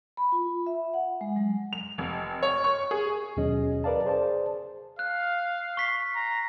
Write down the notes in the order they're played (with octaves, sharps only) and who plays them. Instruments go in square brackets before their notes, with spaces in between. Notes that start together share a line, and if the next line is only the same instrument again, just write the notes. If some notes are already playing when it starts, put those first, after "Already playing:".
[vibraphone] B5
F4
E5
F#5
G#3
F#3
[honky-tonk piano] F7
F1
C#5
C#6
G#4
[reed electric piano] D#2 B2 F#3 C#4 G#4 D#5
A#4 B4 D5 F5 A5
G#4 C5 D5 A5
[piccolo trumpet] F5 [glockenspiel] F#6
[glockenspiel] C#6 B6 C7
[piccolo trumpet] A#5